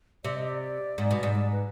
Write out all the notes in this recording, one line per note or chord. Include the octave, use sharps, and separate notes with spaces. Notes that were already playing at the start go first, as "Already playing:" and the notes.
C3 D5
D#5
D5
G#2
B2
G#2
D5
B4